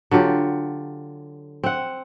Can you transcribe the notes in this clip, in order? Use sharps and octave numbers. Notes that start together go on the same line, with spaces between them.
D3 F#3 F4 G4
C4 F#5